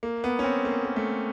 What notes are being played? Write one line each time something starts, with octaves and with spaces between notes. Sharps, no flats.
A#3
B3
C#4
C4
A#3
A#3
A3